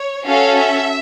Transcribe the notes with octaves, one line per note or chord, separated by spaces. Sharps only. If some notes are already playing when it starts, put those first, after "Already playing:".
Already playing: C#5
C#4 F#4 A4 F5
E5